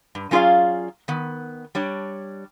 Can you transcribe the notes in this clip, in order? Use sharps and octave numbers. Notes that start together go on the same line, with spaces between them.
G2
F#3 C#4 F4 G#4 D5 F5
D#3 B3
G3 D4 C#5